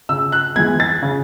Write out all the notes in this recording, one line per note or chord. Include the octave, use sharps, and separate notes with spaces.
C#3 E6
F#6
E3 G#3 B3 G#6
A6
C#3